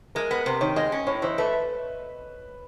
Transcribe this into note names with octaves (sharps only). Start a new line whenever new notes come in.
G#3 A#4
B3
C3 C5
D#3 C#5
G#3 D#5
C#4
A2 C#5
E3 C5
A3 B4